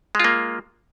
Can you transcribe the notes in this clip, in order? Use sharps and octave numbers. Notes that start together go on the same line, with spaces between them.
G#3 A#3 F4